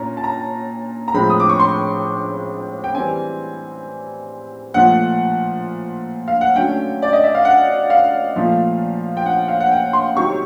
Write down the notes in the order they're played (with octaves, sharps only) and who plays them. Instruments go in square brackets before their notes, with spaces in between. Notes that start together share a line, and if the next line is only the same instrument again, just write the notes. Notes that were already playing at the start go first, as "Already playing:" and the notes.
Already playing: [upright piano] A#2 C#4 A#5
A5
A#5
A#5
A2 F3 G#3 C4 B5
D#6
D6
C#6
C6
G5
E3 G3 C4 G#5
A#2 F3 A3 F#5
F5
F#5
D3 F#3 A3 C#4 G5
D5
D#5
E5
F5
F#5
F5
A#2 F3 A3
G5
F#5
F5
F#5
G5
C6
C3 D#3 F#3 C#6